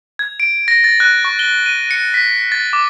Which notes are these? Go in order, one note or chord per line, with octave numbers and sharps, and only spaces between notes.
G#6
D7
A#6
A6
F#6
C#6
G7
D#7
C#7
B6
A6
D6